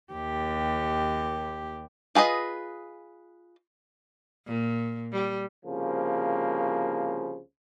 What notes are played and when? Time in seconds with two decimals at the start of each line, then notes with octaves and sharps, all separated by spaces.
0.13 D#2 G4
2.15 F4 G#4 B4 D#5
4.47 A#2
5.12 G3
5.65 C2 C#3 F3 A#3